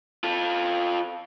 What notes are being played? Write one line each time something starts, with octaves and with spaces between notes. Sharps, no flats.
F4 A4